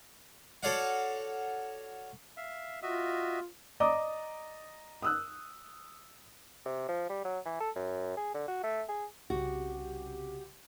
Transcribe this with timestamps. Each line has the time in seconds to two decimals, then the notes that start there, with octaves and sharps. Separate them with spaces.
0.63 F#4 A4 C#5 D5 F5 F#5
2.37 E5 F5
2.82 F4 F#4 D#5 E5
3.80 D5 D#5 A#5 D6 D#6
5.02 D#6 E6 F#6
6.65 C3
6.88 F3
7.09 G3
7.25 F#3
7.45 E3
7.60 A4
7.76 F#2
8.17 G#4
8.34 D3
8.48 F#4
8.63 A3
8.89 G#4
9.30 C2 C#3 F#4 G4